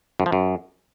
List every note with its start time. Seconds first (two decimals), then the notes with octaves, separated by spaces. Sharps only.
0.20 F#2
0.26 F3
0.32 F#2